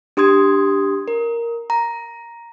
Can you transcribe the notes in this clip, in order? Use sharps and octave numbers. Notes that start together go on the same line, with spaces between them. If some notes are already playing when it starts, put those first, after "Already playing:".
D4 G4 C6 D#6 G#6
A#4
A#5